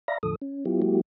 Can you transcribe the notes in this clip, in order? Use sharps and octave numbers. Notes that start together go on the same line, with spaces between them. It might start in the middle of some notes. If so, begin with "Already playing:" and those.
D5 E5 F5 A#5 B5 A#6
E2 A2 D3 F3 A4 D#6
C#4
F#3 B3 E4 F4 G4
F#3 G#3 A#3 E4 F#4 G4